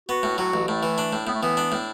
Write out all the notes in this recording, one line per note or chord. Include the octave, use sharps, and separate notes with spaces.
B3 F#4
A2
F#3 F#4
A1
A2 A3
E3
D4
A2
A2 B3
A3
E3 B3
D4
A2